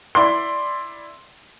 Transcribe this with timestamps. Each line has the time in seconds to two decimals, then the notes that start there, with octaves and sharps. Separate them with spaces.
0.15 E4 D5 C6